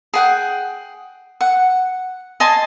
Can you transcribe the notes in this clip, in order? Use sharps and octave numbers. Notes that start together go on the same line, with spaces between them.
G#4 F#5 G5
F#5
D#5 G#5 A5 C6